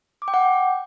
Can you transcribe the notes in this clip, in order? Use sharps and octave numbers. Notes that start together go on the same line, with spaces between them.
D6
G5
F#5